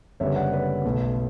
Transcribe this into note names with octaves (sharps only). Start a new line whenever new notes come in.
F#1 F#2 D3 G3 B3 C#5 E5
D5 F#5
B4 D5
B1 B2 A3